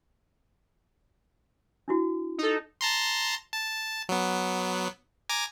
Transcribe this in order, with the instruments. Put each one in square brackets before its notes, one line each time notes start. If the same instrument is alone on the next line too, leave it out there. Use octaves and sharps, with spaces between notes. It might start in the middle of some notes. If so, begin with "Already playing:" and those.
[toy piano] D4 E4 F#4
[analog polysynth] D#4 A4
[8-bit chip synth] A5 A#5 C6
A5
F#3 B3
G#5 A#5 D6